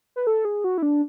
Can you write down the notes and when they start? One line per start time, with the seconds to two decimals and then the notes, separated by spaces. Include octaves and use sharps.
0.16 B4
0.27 A4
0.45 G#4
0.64 F#4
0.78 E4
0.82 D4